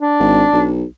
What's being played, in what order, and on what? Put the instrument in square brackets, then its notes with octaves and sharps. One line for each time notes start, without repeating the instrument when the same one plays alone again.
[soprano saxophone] D4
[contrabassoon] G#1
B1